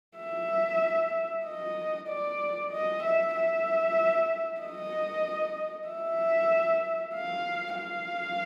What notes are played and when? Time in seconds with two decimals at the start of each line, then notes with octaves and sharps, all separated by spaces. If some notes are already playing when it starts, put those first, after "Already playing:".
0.18 E5
1.44 D#5
2.08 D5
2.71 D#5
3.03 E5
3.35 E5
4.61 D#5
5.88 E5
7.15 F5
7.78 F5